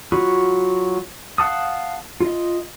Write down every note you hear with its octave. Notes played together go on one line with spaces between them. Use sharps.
F#3 F4 F#4 B5 C#6
F5 F#5 A5 D#6
F4 D#5